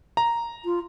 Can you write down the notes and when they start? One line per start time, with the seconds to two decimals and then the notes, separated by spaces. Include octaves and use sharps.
0.17 A#5
0.65 F4